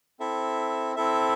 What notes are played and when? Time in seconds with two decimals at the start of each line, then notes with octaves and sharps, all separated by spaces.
0.20 C4 E4 A4 E5
0.96 C4 E4 A4 E5